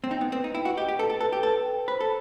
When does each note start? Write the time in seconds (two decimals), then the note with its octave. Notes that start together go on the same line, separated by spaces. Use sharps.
0.04 C4
0.10 D#4 G5
0.21 B3
0.32 C4 B4
0.44 D#4
0.55 E4 G5
0.65 F#4
0.77 G4 D#5
0.88 G4
0.99 A4 B4
1.10 A4
1.20 A4 B4
1.32 G4
1.43 A4 B4
1.66 G5
1.88 B4 C5
2.00 A4